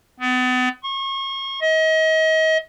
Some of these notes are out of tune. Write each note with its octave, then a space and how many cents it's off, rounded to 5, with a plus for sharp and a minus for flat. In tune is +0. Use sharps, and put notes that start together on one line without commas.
B3 +35
C#6 -35
D#5 +35